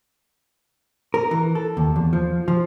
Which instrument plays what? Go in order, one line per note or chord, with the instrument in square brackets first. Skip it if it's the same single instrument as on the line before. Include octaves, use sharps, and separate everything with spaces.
[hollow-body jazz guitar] A#4
E3
A4
D#2
E2
F3
F3